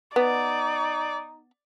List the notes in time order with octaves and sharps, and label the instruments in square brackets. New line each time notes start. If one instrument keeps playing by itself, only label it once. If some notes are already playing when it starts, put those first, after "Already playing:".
[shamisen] B3 [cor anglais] D#4 [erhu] D5